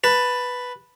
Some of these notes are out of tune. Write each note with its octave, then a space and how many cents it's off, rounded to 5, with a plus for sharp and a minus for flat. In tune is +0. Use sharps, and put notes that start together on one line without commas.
B4 +0 A5 +10